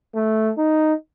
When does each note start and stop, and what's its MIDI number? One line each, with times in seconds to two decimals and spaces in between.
0.15 0.52 57
0.58 0.93 63